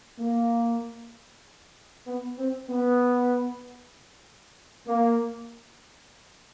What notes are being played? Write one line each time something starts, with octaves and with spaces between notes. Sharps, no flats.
A#3
B3
C4
B3
A#3